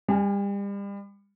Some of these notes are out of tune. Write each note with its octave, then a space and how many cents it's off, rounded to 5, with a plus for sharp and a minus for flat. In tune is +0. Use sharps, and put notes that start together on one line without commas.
G3 +35 G#5 +0